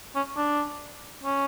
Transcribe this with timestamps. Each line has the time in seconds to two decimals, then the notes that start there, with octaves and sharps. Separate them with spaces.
0.15 C#4
0.37 D4
1.24 C#4